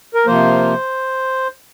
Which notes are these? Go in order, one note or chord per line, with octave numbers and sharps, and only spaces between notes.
A#4
C3 F3 A#3 C5